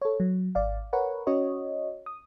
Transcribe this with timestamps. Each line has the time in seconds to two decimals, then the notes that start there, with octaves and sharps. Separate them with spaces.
0.02 A4 C#5
0.20 F#3
0.55 G#1 D5 F5
0.93 A#4 B4 C#5 F#5
1.27 C#4 F#4 C#5 D#5
2.06 D#6